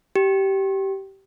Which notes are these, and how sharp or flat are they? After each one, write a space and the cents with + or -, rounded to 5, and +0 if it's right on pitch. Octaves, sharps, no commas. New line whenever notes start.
G4 -20